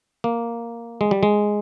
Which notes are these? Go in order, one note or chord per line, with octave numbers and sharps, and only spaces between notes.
A#3
G#3
G3
G#3